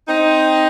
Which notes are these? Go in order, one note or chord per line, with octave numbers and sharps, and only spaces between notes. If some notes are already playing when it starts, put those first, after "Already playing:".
C4 D#4